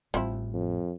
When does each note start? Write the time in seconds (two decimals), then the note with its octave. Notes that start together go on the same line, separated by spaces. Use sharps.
0.14 A1 F3 G3 C4 E4
0.53 F2